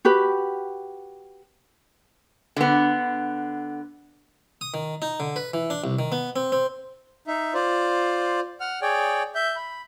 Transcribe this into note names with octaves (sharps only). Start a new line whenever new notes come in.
F#4 G4 B4
D3 B3
D#6
D#3
D#4
D3
B4
E3
D4
C2
D#3
B3
C4
C4
D#4 E5
F4 C5 D5
F#5 F6
G#4 C#5 D5 G5
E5 G6
B5